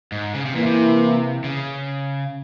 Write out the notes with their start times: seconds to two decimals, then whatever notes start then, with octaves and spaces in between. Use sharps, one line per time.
0.12 G#2
0.34 C#3
0.45 C3
0.55 A#2 E3 A#3 E4
0.66 C3
1.44 C#3